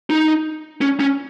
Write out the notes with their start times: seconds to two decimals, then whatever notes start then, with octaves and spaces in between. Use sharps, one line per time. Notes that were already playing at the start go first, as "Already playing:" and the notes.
0.10 D#4
0.81 C#4
1.00 C#4